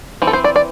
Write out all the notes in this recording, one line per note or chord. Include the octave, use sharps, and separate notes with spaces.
E3 C4
A4
C5
D5
D5